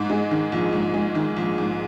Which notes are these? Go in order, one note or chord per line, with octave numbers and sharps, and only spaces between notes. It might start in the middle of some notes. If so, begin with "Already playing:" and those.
Already playing: G#2
G#3
D#3
A#1
G#2
G#3
D#3
A#1
G#2